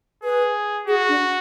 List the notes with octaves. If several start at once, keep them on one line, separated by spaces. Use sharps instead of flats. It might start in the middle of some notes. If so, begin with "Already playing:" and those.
G#4 B4
F#4 G#4
D4